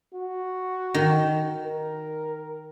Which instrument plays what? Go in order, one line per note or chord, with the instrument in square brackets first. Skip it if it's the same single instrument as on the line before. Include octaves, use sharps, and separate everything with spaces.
[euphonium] F#4
[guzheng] D#3
[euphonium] A#4